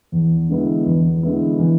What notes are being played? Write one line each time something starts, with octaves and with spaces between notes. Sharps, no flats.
E2
D3 G#3 B3 E4
E2
D3 G#3 B3 E4
E3